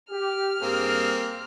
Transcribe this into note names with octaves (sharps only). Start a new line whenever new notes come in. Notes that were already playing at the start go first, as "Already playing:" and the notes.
G4 F6
G2 A#3 C4 G4 G#4